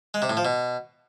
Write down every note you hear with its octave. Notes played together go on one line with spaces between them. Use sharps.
G#3
C3
A2
F3
B2